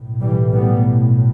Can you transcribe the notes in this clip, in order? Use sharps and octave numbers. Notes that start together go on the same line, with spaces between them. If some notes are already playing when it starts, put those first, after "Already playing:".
Already playing: B1 A2
E3 G3
G3 B3